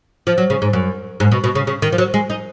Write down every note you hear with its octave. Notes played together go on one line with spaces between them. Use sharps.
F3
F#3
C#3
G#2
F#2
G#2
B2
B2
C#3
C#3
D#3
F3
F#3
G#3
D#4